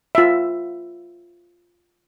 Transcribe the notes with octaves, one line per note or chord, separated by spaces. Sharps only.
F4 E5